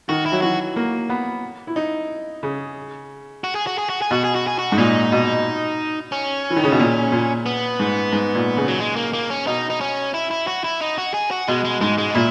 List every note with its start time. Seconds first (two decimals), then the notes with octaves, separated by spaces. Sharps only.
0.09 D#3 F#4
0.26 E4
0.32 F#3
0.42 E3 F#4
0.76 A#3
1.10 B3
1.67 E4
1.76 D#4
2.43 C#3
3.44 F#4
3.55 G#4
3.67 F#4
3.78 G#4
3.90 F#4
4.02 G#4
4.11 B2 F#4
4.24 G#4
4.35 F#4
4.47 G#4
4.59 F#4
4.72 G#2
4.77 A#2 D#4
5.12 B2
6.12 C#4
6.50 E3
6.56 D#3
6.64 C#3
6.72 B2
6.80 A#2
7.12 A#2
7.46 B3
7.79 G#2
8.13 G#2
8.35 A#2
8.57 C#3
8.68 F#3
8.80 G#3
8.96 A#3
9.13 A#3
9.30 C#4
9.47 B2 D#4
9.70 D#4
9.81 C#4
10.14 E4
10.31 E4
10.47 F#4
10.64 E4
10.81 D#4
10.98 F#4
11.14 G#4
11.31 F#4
11.48 B2 G#3
11.65 G#3
11.81 G#2 G#3
11.98 G#3
12.11 D#4
12.15 A#2 E4